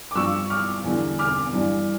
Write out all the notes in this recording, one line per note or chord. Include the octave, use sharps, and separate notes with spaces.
D6
G2 F3 C#6 E6
D6 F6
E2 D3 G3
D6 F6
G2 E3 G3